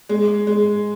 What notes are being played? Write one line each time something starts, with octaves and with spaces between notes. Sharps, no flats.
G#3
G#3